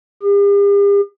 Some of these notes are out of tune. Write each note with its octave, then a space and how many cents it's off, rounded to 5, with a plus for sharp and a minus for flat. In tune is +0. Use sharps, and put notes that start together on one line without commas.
G4 +45